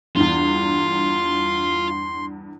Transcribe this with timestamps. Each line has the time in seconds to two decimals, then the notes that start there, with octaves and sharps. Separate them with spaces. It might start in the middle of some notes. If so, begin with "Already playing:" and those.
0.16 E2 G2 F4 C6